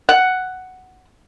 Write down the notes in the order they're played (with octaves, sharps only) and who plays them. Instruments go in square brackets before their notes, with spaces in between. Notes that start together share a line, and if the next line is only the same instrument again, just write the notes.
[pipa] F#5